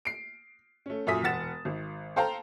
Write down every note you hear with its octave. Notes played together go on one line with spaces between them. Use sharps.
C7 D7
A3 C#4
F#2 A#2 E5 D#6 B6
E1 F#5 A6 E7
G#1
A4 C5 F5 G5 A5 A#5